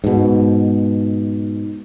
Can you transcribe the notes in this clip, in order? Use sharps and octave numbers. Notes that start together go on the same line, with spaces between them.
G#2 B2